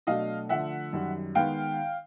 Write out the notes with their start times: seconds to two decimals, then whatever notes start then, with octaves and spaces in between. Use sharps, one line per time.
0.07 B2 F#3 A3 D4 D#5 F5
0.49 D3 F3 A3 E5 F#5
0.93 F#2 D#3 G3
1.35 D#3 G#3 B3 F5 G5